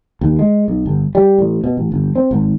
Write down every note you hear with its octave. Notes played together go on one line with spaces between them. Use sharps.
D#2
G#3
B1
G1
G3
A1
B2
A1
G1
C4
G#1